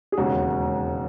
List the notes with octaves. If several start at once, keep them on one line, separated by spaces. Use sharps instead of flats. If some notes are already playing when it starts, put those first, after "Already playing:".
G#4
E1 D#2 C#3 G#3 F#4